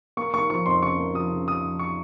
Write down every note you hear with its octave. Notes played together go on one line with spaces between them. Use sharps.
A#3 C#6
A#3 C#6
F3 C#6
F2 C6
C#3 C#6
A#3
F3 D#6
C#3
F3 D#6
F2
C#6